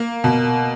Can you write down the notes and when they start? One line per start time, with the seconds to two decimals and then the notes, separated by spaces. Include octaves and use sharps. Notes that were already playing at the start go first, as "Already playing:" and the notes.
Already playing: A#3
0.24 B2